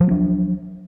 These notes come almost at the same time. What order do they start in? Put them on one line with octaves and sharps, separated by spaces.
F3 F#3 B3 D4